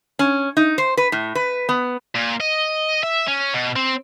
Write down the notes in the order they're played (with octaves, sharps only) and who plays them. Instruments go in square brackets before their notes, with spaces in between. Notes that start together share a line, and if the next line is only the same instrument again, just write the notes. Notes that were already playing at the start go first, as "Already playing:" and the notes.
[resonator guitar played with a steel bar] C#4
D#4
C5
B4
A2
B4
B3
[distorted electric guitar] A#2
D#5
E5
C#4
B2
C4